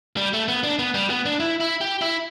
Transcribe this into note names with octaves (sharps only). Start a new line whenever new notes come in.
G3
A3
B3
D4
B3
G3
B3
D4
E4
E4
G4
E4